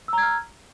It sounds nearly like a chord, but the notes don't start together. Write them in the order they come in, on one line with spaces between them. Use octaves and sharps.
E6 A#5 G#6 F6